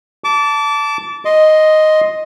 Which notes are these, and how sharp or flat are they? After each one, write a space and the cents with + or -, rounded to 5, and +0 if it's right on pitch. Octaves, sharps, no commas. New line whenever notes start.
A5 +0 D6 -25
D#5 +0 C6 +0